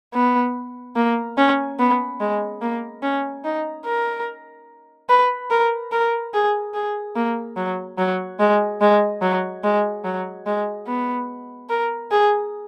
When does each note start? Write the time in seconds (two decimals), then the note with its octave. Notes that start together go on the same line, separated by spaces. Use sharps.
0.14 B3
0.96 A#3
1.37 C#4
1.79 B3
2.20 G#3
2.61 A#3
3.03 C#4
3.44 D#4
3.86 A#4
5.09 B4
5.50 A#4
5.92 A#4
6.34 G#4
6.74 G#4
7.16 A#3
7.57 F#3
7.98 F#3
8.40 G#3
8.81 G#3
9.22 F#3
9.64 G#3
10.05 F#3
10.47 G#3
10.87 B3
11.70 A#4
12.11 G#4